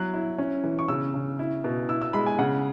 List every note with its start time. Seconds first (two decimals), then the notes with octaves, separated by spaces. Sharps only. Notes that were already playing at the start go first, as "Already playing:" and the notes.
Already playing: F#3 E4 F#6
0.14 E4
0.38 C#4
0.64 E3
0.79 C#6
0.88 C#3 E6
1.14 C#3
1.39 E4
1.64 B2
1.89 E4 E6
2.02 E6
2.13 G#3 B5
2.26 G#5
2.39 C#3 F#5